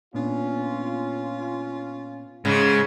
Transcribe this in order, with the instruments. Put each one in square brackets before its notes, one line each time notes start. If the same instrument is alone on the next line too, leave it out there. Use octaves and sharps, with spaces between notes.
[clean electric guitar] A#2 B3 D4 [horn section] C#4 F4
[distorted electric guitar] G#2 [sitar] C#3